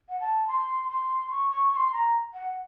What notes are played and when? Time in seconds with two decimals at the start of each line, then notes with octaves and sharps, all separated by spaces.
0.09 F#5
0.20 A5
0.48 C6
0.89 C6
1.31 C#6
1.51 C#6
1.72 C#6
1.77 C6
1.93 A#5
2.34 F#5